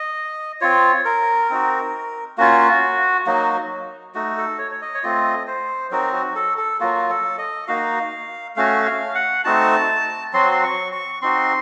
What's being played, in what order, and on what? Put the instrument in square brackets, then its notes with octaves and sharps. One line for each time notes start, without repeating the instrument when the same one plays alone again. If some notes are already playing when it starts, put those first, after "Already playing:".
Already playing: [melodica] D#5
C4 F4 C#5
A#4
C4 D#4 F#4
A#3 C#4 F4 F#4
F#3 A#3 D#4 F#4
A3 D#4 F#4
A4
C#5
C#5
D#5
C#5
A3 C4 F4 D#5
C5
F#3 C4 D#4 F#4 A#4
F#4
A4
A4
F#3 A#3 F4 F#4
A4
D#5
A#3 D#4 F#4 F5
A3 C#4 F#4 F5
F5
F#5
A3 C4 D#4 F#4 A5
F#3 C4 F#4 C6
C6
C#6
C#6
C4 D#4 F#4 C6